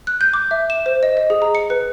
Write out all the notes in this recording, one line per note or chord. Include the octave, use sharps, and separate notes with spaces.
F#6
G6
D6
E5
E7
C5
D#5
D#5
G#4
A#5
C#7
B4